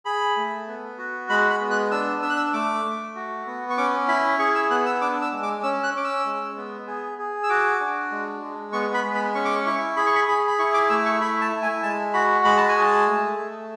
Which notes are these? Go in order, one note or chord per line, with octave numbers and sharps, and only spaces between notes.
G#4 B5
A3
B3
F#4
G#3 B5
B5
B3
F#6
D4 E6
D4 E6
F#6
E6
A3 D6
A3
F#4
B3
C#6
C#4 D6
E4 B5
G#4 C#6
E6
B3 F#6
E6
D4 D6
E6
G#3
D6
C#4 E6
F#6
C#4 D6
E6
G#3
B3
G#4
G#4
E6
F#4 D6
D4
G#3
G#3
B3 C#6
B5
G#3
B5
C#4 C#6
D6
C#6
E4 C#6
G#4 B5
C#6
B5
G#4 B5
B5
E4 C#6
D6
A3 E6
C#6
E4 B5
A5
E4
G#5
G#3 A5
F#4 B5
G#3 B5
A5
G#5
G#4 A5
A3
A3